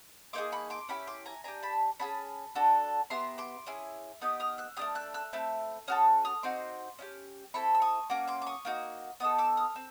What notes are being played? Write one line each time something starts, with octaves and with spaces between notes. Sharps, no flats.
A#3 D#4 G#4 C6 D6
B5 C#6
C6 D6
C#4 E4 G4 B5 C#6
C6 D6
G#5 A#5
D4 G4 G#5 A#5
A5 B5
C#4 F4 G#4 A5 B5
D4 F#4 A4
B3 E4 G4 A#5 C6
C6 D6
C#4 E4 G#4
B3 D#4 G4 D#6
D#6 F6
E6 F#6
A3 D4 G4 D#6 F6
E6 F#6
E6 F#6
A3 C4 E4
C#4 F#4 A4 D#6 F6
D#6 F6
C4 D#4 F#4 C6 D6
C#4 E4 G4
C4 E4 A4 B5 C#6
E6
C#6 D#6
A#3 C#4 F#4 D6
C6 D6
D6
C#6 D#6
A#3 D#4 F#4
B3 D#4 A4 D#6
D6 E6
D#6 F6
C4 E6